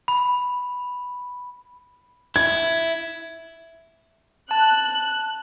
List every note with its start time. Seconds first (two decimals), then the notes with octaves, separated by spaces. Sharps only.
0.08 B5
2.36 E4 G#6
4.51 A5 F#6